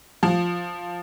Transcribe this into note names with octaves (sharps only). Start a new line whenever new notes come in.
F3